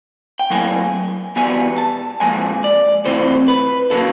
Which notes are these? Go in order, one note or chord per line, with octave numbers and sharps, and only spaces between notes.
G5
A2 F#3 A#3 G#5
E2 B2 G3 B3 G#5
A5
A#2 F3 G#3 G#5
D5
C3 E3 A3 C4 C5
B4
C#3 F#3 A#3 A4